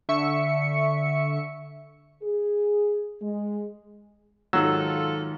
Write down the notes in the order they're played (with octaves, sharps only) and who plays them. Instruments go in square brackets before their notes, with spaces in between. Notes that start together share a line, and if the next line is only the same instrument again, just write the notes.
[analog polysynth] D3 E5 C#6 C#7
[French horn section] G#4
G#3
[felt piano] G#2 D#3 [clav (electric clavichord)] F#3 [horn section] F4 A4 [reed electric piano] E6